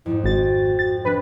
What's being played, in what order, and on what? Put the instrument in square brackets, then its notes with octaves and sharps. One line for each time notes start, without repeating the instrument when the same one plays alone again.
[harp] F2 G#2 [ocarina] E4
[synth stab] G#1 A6 [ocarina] F#4
[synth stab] A6
[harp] F1 [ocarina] D4 [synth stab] B4